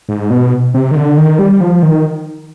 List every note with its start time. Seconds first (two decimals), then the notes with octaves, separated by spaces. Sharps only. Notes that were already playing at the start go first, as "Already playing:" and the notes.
0.09 G#2
0.30 B2
0.74 C3
0.91 D#3
0.95 D3
1.18 D#3
1.39 G3
1.61 F3
1.83 D#3